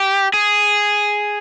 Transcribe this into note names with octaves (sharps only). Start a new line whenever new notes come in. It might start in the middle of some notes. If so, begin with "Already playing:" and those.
Already playing: G4
G#4